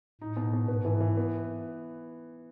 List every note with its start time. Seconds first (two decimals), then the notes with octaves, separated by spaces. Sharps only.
0.21 A2 D#4
0.37 B2
0.53 B2
0.68 G#2 B3
0.85 E3
1.00 E3
1.17 B3